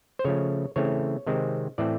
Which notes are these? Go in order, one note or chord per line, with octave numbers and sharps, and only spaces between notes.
C5
C#3 F3 A3 C#5
C#3 E3 A3 C4 C#5
C3 D#3 G#3 C4
A2 E3 A3 C4 D5